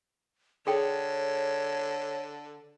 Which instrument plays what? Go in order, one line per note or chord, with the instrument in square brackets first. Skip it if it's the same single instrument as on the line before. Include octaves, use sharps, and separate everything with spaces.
[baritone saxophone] D3 [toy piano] G#4 A4 G5 [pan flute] C#5